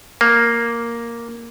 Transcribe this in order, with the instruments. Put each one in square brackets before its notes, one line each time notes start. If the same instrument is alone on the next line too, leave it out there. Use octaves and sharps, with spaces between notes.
[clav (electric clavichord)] A#3